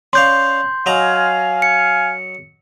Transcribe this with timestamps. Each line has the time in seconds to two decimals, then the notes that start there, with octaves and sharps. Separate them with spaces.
0.13 C#4 D5 F5 C6 G6
0.86 F#3 D#5 F5 G#5 A#5
1.62 C#7